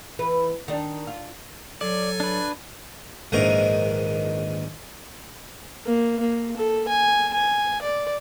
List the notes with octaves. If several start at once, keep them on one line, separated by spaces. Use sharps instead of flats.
E3 B4
D#3 D4
F4
F#3 A4 D5 G#5
D4 B4
A#1 G#2 D#3 E3 A#4
A#3
A#3
A4
G#5
G#5
D5